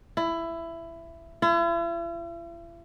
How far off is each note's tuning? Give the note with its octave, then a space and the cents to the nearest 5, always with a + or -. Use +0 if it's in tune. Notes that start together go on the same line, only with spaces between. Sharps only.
E4 +15
E4 +45